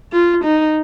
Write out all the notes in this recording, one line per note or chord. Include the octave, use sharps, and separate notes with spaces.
F4
D#4